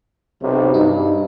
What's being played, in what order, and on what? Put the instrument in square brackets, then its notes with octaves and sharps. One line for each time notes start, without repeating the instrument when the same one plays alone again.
[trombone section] B1 C3
[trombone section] G2 [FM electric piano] D#4